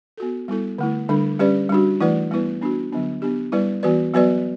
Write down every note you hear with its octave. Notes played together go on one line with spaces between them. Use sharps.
B3 F#4 A4
G3 B3 E4 A4
D3 A3 E4
D3 G3 D4 A4
G3 C#4 G4 B4 D5
G3 D4 F#4
E3 A3 E4 B4 D5
G3 B3 E4 B4
B3 D4 F#4
D3 F#3 B3 D4
B3 D4 G4
G3 B3 E4 B4 D5
E3 B3 F#4 B4 D5
F#3 B3 F#4 B4 D5